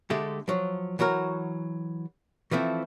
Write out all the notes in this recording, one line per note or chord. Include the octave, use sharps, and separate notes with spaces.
D3 G#3 A3 G4
F3 F#3
E3 F#3 F#4 A#4
E3 F3 A3 C4